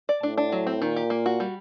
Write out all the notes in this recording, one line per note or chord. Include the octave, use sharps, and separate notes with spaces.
D5
A2 D4
D4
F#3
C4
A#2 D#3
G4
A#3
F#4
G3